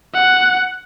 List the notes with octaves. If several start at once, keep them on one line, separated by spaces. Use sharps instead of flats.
F#5